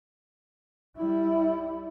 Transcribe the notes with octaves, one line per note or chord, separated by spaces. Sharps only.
G3 E4